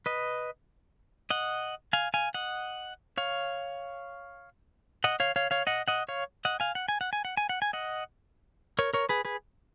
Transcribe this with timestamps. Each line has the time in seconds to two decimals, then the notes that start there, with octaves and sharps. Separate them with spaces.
0.06 B4 D#5
1.30 D#5 F#5
1.93 F5 G#5
2.14 F5 G#5
2.34 D#5 F#5
3.18 C#5 F5
5.04 D#5 F#5
5.20 C#5 F5
5.36 C#5 F5
5.51 C#5 F5
5.67 D#5 F#5
5.88 D#5 F#5
6.09 C#5 F5
6.45 D#5 F#5
6.60 F5 G#5
6.75 F#5
6.88 G#5
7.01 F#5
7.13 G#5
7.25 F#5
7.37 G#5
7.49 F#5
7.62 G#5
7.73 D#5 F#5
8.79 A#4 C#5
8.93 A#4 C#5
9.09 G#4 B4
9.25 G#4 B4